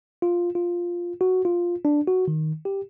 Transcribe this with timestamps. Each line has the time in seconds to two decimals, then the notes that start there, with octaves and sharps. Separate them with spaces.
0.22 F4
0.55 F4
1.21 F#4
1.45 F4
1.85 D4
2.07 F#4
2.28 D#3
2.65 G4